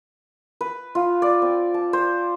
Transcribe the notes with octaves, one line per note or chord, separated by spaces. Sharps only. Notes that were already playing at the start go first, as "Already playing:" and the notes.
B4
F4
D5
C4
A5
C5